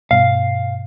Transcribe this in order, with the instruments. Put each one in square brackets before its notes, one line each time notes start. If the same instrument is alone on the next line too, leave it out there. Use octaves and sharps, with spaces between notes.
[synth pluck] G2 B2 [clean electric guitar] F5